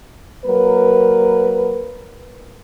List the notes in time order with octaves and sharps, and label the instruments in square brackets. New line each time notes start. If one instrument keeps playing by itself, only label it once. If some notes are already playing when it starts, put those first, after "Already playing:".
[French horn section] F#3 A#3 A#4 B4